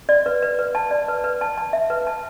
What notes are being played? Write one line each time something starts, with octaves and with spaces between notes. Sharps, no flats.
D5
B4
B4
B4
A5
D5
B4
B4
A5
A5
E5
B4
A5